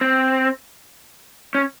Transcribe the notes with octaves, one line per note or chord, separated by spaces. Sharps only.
C4
C#4